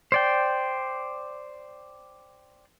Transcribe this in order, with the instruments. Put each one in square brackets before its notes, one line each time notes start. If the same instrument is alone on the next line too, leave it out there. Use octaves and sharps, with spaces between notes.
[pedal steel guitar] C5 D5 G5